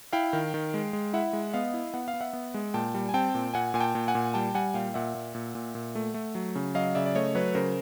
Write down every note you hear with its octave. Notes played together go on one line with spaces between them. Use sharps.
E4 F5 G5
D#3
D#3
G#3
G#3
E4 E5 F#5
G#3
B3 D#5 F5
E4
B3 F#5
F5
B3
E5 F#5
B3
G#3
A#2 G5 A5
G3
G#5
C4 G5 A5
A#2
A#2 F#5 G#5
A#2 G#5
G5 A5
A#2
F#5 G#5
A#2
G3 G5 A5
G3 F#5 G#5
A#2 F5 G5
A#2 E5 F#5
A#2
A#2
A#2
A#2
A3
A3
F#3
C#3
F#3 D#5 F5
C#3 D5 E5
D5
A3 C#5 D#5
F#3 B4 C#5
C#3 A#4 C5